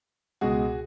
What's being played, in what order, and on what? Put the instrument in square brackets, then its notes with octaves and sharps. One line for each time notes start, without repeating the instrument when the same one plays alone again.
[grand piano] C#2 B2 G#3 F#4 G#4